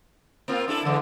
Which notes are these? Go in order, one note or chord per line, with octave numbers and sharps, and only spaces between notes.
A#3 C4 F4
D4 E4 A4
D3 E3 G#3